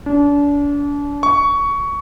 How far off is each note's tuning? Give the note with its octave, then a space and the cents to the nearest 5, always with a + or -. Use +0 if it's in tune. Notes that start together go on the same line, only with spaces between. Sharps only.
D4 -35
C#6 +15